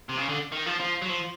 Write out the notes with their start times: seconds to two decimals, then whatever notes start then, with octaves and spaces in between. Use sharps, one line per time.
0.09 C3
0.18 C#3
0.28 D3
0.52 D#3
0.66 F3
0.80 F3
1.02 F#3
1.09 F3